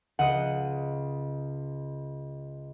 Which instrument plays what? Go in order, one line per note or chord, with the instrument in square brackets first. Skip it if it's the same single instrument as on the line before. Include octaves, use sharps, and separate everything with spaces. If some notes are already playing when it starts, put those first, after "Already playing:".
[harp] C#2 D#5 [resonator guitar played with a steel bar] F#5